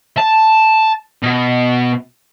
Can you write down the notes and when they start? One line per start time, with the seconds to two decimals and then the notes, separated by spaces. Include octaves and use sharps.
0.17 A5
1.23 B2